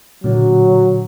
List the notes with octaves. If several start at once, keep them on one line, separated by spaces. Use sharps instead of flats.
A#2 D3 F#3